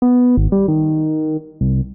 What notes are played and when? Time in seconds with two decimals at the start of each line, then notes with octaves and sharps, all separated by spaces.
0.02 B3
0.37 G#1
0.52 G3
0.68 D#3
1.61 C2